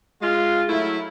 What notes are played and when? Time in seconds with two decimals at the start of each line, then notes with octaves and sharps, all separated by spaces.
0.22 G#3 F4
0.69 F#3 A3 E4